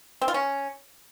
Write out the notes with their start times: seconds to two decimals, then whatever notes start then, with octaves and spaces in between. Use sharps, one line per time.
0.22 C4
0.28 F4
0.34 C#4